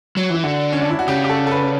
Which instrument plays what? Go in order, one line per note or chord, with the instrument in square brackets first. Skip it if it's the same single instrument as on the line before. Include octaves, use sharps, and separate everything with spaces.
[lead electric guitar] F#3
[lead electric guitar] E3 [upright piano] E4
[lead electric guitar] D3 [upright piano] F#4
[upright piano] C#4
D4
E4
F#4
[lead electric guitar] C#3 [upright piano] G4
[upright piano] G4
A4
A4
B4